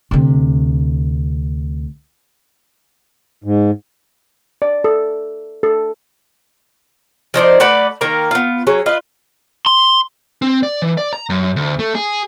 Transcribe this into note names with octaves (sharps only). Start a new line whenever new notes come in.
D2 C3
G#2
D5
A4
A4
F3 D#4 C5 D5
A3 F#4 B4 D5
D#3 A#3 A#4 A#5
B3 F4
F#3 C#4 G#4
F4 B4 D#5
C6
C4
D5
E3
D5
A#5
F#2
D2
A3
G#4